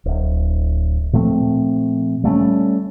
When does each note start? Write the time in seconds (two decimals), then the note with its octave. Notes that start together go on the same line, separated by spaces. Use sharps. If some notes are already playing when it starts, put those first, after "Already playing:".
0.05 D1
1.13 A#2 F3 A3 C4
2.24 G3 A3 C4 C#4